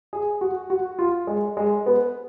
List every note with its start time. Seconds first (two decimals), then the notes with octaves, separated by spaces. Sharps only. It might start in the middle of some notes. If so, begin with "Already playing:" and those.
0.13 G#4
0.41 F#4
0.70 F#4
0.99 F4
1.27 G#3
1.57 G#3
1.86 B3